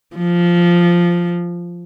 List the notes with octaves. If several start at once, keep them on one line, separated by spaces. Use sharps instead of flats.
F3